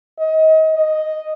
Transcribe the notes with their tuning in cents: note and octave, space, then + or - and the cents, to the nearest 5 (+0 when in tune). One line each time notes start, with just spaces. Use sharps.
D#5 +30
D#5 -5